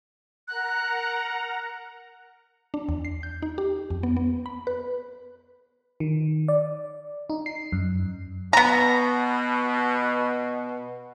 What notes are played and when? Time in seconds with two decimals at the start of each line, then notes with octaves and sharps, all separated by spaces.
0.48 A#4 F#5 A#5 F#6
2.74 D4
2.89 E2
3.05 C7
3.23 G6
3.42 D#4
3.58 G4
3.90 F2
4.03 B3
4.17 B3
4.46 B5
4.67 B4
6.00 D#3
6.48 D5
7.30 D#4
7.46 C7
7.72 F#2
8.53 B2 B3 A#5